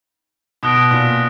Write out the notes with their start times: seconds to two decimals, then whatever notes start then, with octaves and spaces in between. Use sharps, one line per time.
0.63 B2 D#6 F#6 A#6 D7
0.91 A#2